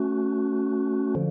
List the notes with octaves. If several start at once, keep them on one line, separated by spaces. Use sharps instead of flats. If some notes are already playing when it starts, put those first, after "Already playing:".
Already playing: A3 C#4 F#4
D3 F3